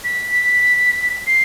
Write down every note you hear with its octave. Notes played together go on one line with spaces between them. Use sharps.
B6
C7